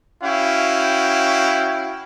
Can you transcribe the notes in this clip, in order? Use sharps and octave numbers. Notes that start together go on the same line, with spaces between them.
C#4 E4 F#4 F5 G5